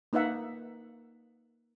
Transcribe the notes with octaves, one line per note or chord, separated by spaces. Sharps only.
A#3 D#4 B4 E5 F#5